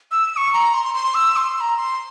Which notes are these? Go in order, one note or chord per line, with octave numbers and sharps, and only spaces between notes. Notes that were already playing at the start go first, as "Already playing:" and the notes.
E6
E6
C#6
A#5
C6
C6
E6
C6
C6
A#5
C6